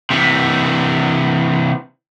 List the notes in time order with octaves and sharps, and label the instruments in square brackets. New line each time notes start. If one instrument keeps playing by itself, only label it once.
[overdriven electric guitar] C3 E3